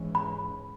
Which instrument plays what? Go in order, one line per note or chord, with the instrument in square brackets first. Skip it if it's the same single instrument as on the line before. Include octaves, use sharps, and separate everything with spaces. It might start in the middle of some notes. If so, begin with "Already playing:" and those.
Already playing: [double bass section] G#2 E3 G#3 C#4
[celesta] B5